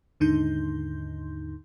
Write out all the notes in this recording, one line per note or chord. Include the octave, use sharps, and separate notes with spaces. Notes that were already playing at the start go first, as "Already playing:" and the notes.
D#2 G#2 D3 D#4 C6 G6